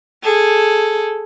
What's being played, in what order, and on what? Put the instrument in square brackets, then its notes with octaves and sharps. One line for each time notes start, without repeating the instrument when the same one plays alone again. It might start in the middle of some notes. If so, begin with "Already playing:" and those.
[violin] G#4 A4